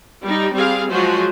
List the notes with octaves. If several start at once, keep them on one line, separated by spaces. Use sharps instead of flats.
G3 D#4
G3 C4 G#4 F5
F3 F#3 G#3 F4 F#4 C5